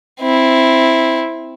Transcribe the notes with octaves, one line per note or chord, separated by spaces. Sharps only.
C4 E4